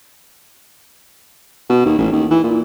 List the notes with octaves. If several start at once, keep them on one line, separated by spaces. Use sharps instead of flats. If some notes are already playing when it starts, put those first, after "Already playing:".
B2
D#2
A1
D#2
E3
A#2